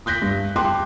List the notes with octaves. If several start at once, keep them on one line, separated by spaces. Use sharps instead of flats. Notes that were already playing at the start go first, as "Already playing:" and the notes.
D#6 F#6 G6 A#6 B6
G2
G5 A5 C6 D6 F#6